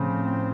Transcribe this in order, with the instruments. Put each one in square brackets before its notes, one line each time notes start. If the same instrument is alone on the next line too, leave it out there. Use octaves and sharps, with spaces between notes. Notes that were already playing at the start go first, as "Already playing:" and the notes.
Already playing: [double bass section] A2 F3 C4 [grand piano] C#3